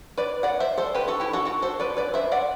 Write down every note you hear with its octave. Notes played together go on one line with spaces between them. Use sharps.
B4 D5
D5 F#5
C5 E5
A4 C5
G4 B4
F#4 A4
E4 G4
F#4 A4
F#4 A4
A4 C5
B4 D5
B4 D5
C5 E5
D5 F#5